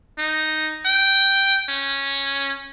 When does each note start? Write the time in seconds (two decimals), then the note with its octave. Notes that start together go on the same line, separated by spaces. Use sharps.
0.19 D#4
0.86 G5
1.69 C#4